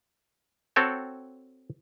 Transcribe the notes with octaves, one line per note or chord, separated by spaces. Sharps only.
C4 F#4 A4 C#5 G5 A5